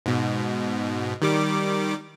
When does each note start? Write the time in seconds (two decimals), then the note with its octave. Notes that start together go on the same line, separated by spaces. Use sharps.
0.06 G#2 B2
1.22 D#3 G3 D6